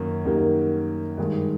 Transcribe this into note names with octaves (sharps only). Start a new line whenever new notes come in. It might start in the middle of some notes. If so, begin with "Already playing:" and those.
Already playing: F#2 D#3 A#3
F#2 D#3 G3 A#3
G2 D#3 G#3